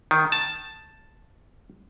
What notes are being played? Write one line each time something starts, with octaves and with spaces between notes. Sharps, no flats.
D#3
A5